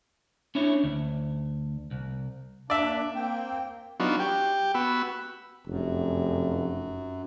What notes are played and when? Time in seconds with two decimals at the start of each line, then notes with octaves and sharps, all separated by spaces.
0.55 C#4 D4 E4 C#5
0.84 D2
1.91 C2
2.70 A#3 D4 D5 E5
3.15 A#3 C4 G5
4.00 F#3 B3 D4 D#4 F4 F#4
4.20 G4 G5
4.74 B3 F#4 B5 E6
5.67 F1 F#2